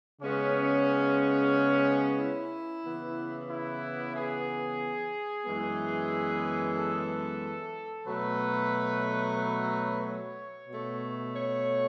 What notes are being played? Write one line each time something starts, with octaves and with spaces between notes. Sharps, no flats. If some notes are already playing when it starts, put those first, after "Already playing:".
C#3 G#3 B3 C#4
E4
C#3 E3 B3
E4
G#4
F#2 E3 G#3 B3
A4
B2 F#3 A3 B4
B4
C#5
B2 A3
C#5